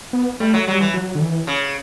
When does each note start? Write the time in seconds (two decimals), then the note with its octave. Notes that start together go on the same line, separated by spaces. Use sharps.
0.13 B3
0.40 G3 A3
0.54 F#3
0.67 F#3 G3
0.80 E3
0.94 F#3
1.15 D3
1.21 E3
1.47 C#3